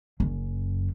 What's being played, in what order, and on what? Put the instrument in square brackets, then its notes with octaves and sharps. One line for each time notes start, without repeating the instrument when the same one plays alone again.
[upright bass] F#1 F#2